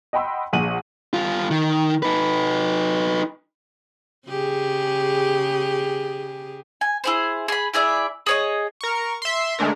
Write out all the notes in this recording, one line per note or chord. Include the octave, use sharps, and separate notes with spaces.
D#5 F#5 G5 B5 C6 E6
A#1 G#4 F#5 D#7 F#7
G2 F4
D#3
D#4 B4
C#3 G4 G#4
G#5
E4 G#4 C5
G#4 B5
E4 G#4 D5 E5
G#4 C#5 D#5
A#4 C#6
E5 C6
D3 G#3 A3 D4 A#4